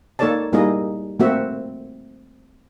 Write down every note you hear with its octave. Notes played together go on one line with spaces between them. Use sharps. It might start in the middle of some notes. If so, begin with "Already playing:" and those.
A#3 D#4 A4 C#5 D5 A5
G3 A#3 D#4 E4 G#4 D#5
A3 A#3 C4 F#4 E5